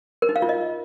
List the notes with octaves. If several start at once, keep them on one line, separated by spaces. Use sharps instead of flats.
A#4
D#4
F5
F4
D#5